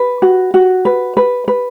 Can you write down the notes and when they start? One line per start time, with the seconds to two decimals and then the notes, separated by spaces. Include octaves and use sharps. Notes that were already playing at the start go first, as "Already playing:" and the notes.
Already playing: B4
0.22 F#4
0.54 F#4
0.85 B4
1.17 B4
1.48 B4